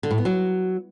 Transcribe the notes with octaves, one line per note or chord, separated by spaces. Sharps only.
D3
A2
B3
F#3